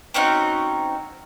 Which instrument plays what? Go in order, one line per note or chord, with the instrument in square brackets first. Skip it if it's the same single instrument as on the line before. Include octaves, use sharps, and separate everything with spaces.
[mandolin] C4 C#4 D#4 F#4